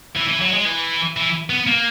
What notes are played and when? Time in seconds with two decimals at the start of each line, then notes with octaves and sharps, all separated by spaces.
0.16 E3
0.28 E3
0.41 F#3
0.53 G#3
0.65 E3
1.17 E3
1.50 B3
1.67 A#3